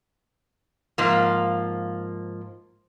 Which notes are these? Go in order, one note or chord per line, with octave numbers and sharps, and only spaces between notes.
G#2 F3 A#3